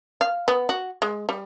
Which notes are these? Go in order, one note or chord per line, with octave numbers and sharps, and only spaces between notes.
F5
B3
F#4
G#3
G3